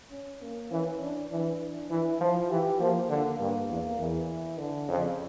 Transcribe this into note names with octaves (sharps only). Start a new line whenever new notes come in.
C#4
A#3
E3 C#4
D4
E3 D4
E3 E4
F3 F4
E3 G4
F3 A#3
D3
G2 A#3
E2
E2 E3
D3
F2 C#3